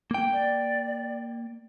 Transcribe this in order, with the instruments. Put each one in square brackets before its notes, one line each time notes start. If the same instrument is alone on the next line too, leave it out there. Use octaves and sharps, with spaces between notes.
[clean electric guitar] A#3 G5
[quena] D5